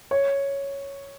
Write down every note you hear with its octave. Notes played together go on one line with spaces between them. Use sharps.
C#5